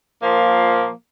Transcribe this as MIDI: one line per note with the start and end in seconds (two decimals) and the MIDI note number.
0.23 0.90 46
0.23 0.90 53
0.23 0.90 58